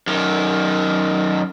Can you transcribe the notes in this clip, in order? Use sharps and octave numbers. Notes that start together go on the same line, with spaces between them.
F#2 D#3